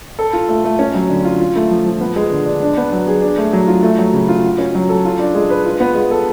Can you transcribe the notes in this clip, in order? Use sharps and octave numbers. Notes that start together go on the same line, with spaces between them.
A4
F4
A3
A3
C#4
F#3
D3
F4
F4
A3
F3
F3
B3
G#3
D3
D4
D4
B3
F#3
G#4
D4
A3
F#3
F4
A3
F#3
C#3
F4
F#4
C#4
F#3
A4
F4
D4
G#3
B4
F4
B3
G#3
A4